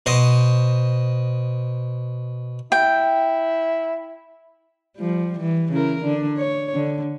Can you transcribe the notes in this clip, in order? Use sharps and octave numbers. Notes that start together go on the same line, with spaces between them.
B2 C5 D#5
E4 G5
F3 G3
E3
C#3 E4 A#4
D3 D4
C#5
D3